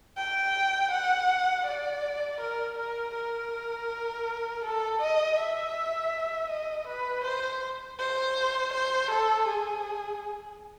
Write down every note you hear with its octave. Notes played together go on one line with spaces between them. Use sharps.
G5
F#5
D5
A#4
A#4
A#4
A4
D#5
E5
D#5
B4
C5
C5
C5
A4
G#4